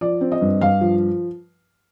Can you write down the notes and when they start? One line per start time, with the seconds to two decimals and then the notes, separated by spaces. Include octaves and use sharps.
0.01 F3 D5
0.21 C4
0.31 D#5
0.41 G2
0.61 G2 F5
0.81 F3